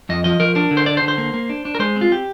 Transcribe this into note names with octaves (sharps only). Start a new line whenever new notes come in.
F2 D#5
F3 D#5
F3 A#4
D4 A#4
D3
C5
D4 D5
C5
D3
C5
A#3
A#3
D4
D4
A#4
G#3 C5
C4
F4
G4